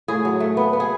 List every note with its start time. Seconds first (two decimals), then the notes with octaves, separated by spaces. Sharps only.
0.08 A2 G#4
0.25 F#3
0.40 A3
0.57 B3
0.73 B3
0.80 G#4